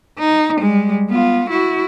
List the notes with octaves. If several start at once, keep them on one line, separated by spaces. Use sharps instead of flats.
D#4
G3 G#3
B3 F4
E4 F#4